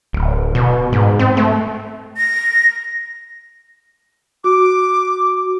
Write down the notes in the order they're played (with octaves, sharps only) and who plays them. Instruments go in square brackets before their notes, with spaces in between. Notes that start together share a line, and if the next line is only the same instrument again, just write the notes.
[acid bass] D1
B2
G#2
C4
A3
[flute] A#6
[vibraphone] F#4 [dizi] D6